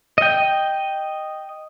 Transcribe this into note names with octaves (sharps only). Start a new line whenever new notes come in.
D#5 G5